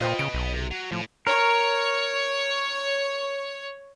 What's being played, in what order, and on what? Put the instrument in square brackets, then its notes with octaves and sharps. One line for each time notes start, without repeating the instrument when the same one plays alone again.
[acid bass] A#2 [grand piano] F4 C5 G5 [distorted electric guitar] B4 D#5
[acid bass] C#3 [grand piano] D7
[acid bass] B1
[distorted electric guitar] C3
F#3
[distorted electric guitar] A2 [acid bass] F3
[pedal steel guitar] A#4 [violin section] C#5